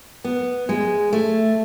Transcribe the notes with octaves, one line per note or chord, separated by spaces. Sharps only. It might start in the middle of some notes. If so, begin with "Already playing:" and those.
B3
G#3
A3